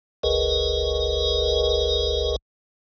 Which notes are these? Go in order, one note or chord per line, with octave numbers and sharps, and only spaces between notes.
F#1 C#2 G#4 A#4 B4 D#5